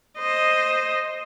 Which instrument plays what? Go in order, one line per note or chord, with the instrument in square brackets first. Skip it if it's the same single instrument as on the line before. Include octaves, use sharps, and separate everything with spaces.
[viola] C5 D#5